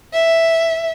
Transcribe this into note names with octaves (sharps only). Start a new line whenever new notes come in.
E5